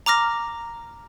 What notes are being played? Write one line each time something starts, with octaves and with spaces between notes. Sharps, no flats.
A#5 D6 F6 A#6